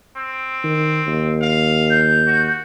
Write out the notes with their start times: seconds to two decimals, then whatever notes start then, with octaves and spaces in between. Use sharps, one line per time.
0.17 C4
0.64 D#3
1.07 D#2
1.42 F5
1.90 G6
2.27 F#4